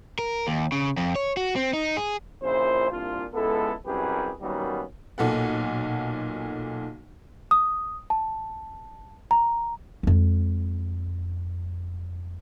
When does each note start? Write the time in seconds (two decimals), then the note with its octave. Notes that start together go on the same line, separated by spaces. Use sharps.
0.19 A#4
0.47 D#2
0.72 C#3
0.97 F2
1.16 C#5
1.37 F#4
1.56 C4
1.73 D#4
1.97 G#4
2.42 A#1 A#2 C#3 E4 C5
2.91 C2 A#2 D4 F4
3.34 C#2 G#3 B3 E4 A4
3.86 C2 F#2 G4 G#4 B4
4.41 D#3 F#3 G3 A#3 B3 C#4
5.18 B1 A#2 A4 F#5
7.51 D#6
8.10 A5
9.31 A#5
10.03 F2 G#3